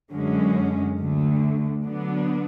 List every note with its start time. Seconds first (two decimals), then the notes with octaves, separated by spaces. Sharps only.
0.12 F#2 D3 G#3 C#4
0.99 D2 D3 A3
1.85 D3 F#3 B3 D4